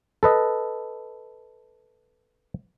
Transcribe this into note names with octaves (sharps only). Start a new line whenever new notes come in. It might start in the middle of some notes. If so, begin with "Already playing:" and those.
A4 B4 D#5